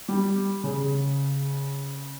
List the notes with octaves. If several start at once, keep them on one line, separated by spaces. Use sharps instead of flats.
G3
C#3